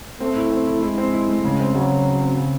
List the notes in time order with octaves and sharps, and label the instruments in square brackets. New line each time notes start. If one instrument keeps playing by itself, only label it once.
[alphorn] A3 [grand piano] C4
[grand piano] E4
C4
E4
[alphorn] G#3 [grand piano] E4
[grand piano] C4
E4
A3
C#3
C4
[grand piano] C#3 [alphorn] F#3
[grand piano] C#3
C#3
C4
C#3